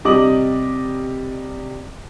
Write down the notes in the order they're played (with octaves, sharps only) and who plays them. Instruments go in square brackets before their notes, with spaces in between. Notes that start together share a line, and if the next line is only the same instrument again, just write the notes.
[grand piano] C3 G3 D#5 D6 D#6 F#7